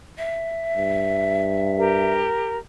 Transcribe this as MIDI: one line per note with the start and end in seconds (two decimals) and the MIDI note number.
0.18 2.12 76
0.77 2.34 43
1.76 2.56 67
1.76 2.56 70